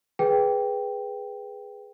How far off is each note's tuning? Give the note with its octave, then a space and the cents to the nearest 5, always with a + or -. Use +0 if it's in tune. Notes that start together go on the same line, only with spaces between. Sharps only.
G#4 +0 B4 +0 G5 +0